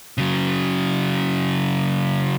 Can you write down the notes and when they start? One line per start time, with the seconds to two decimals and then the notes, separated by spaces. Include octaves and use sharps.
0.18 C#3 F#3